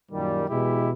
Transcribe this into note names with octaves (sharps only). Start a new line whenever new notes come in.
F#2 A#2 D#3 G3
B2 E3 G#3 E4 G4